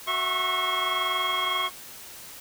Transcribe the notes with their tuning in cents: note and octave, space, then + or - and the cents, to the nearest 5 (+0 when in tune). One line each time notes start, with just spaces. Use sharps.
F#4 +0 E5 +0 C#6 -30